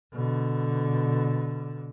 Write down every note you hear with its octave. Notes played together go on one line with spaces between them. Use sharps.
B2 D3